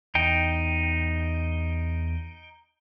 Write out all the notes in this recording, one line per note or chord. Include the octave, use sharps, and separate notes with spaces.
E2 D#4 G5